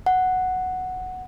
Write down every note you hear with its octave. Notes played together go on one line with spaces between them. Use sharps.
F#5